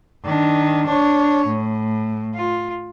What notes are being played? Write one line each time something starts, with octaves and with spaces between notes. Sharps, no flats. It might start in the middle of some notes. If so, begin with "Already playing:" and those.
D#3 D4
D4 C#5
A2
F4